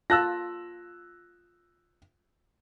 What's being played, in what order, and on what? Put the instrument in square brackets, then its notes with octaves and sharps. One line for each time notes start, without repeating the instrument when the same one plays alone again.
[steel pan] F4 A5 [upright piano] E6 F#6 A#6